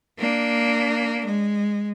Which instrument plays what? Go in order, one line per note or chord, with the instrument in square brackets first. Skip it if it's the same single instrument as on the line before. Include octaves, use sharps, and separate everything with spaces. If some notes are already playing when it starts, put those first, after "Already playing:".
[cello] A#3 D4
G#3